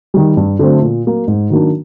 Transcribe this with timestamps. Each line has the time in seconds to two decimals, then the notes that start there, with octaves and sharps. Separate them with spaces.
0.14 D#3 G3
0.37 G2
0.59 D3 F#3 A3 C4
0.82 A#2
1.05 F#3 A#3
1.28 G#2
1.50 D#3 F#3 A#3 D4